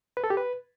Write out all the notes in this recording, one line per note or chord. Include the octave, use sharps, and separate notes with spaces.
B4
A4
G4
B4